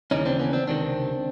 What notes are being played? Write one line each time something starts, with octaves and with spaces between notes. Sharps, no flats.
D#2 C#3 E3 C#4 D#4
C4 D4
B3 C#4
C4 D4
C#2 C3 D#3 C4 D4